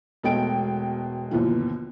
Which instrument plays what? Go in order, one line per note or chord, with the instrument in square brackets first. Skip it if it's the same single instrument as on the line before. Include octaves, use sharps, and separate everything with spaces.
[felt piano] E1 B2 G#3 A3 G5 D7
G1 D#2 B2 E3 F3